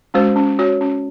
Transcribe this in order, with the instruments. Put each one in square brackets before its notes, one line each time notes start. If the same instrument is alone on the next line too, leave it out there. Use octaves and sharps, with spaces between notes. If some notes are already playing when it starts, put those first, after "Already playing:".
[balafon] G#3 C#4 F#4 C5
C#4
F#4 C#5
C#4